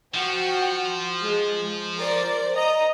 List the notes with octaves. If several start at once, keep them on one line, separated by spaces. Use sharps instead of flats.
F3 F#4 G5
G#3
A#4 C5 D5
D#5 A#5 D#6